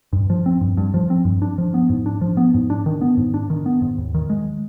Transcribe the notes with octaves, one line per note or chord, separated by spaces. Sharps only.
G2
F3
C4
G2
G2
F3
C4
G2
D4
F3
B3
G#2
D4
F3
B3
G#2
D4
D#3
B3
G#2
D4
D#3
B3
G#2
D#2
D#3
G#3